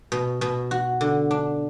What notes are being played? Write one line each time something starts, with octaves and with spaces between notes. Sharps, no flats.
B2
B2
F#4
D3
D4